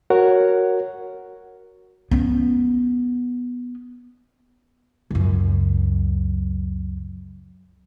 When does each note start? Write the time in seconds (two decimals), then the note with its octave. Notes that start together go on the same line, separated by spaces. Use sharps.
0.10 F#4 A#4 C#5 F#5
2.11 B3 C#4
5.10 C#2 F#2